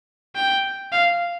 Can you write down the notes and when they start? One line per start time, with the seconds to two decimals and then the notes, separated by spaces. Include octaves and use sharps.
0.36 G5
0.92 F5